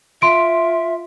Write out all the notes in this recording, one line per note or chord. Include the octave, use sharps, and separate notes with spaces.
F4 E5 C6 D7